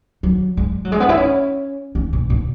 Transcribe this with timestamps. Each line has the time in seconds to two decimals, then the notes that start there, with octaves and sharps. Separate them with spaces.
0.23 F#3
0.57 G#3
0.85 F#3
0.92 G#3
1.00 B3
1.09 E4
1.17 C#4
1.95 C#4
2.13 B2
2.30 B2